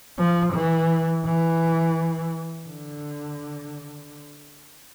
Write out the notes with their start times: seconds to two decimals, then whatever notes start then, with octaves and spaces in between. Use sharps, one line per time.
0.18 F3
0.54 E3
1.25 E3
2.66 D3